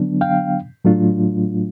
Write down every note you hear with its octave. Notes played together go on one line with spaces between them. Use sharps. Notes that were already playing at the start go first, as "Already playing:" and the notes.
Already playing: D3 F#3 B3 D4
F5 G5
A2 F#3 A3 D4 F4